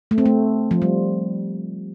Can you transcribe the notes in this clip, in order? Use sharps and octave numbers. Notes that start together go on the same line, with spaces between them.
A3
C4
A3
F3
G3